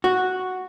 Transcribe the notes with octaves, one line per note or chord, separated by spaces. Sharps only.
F#4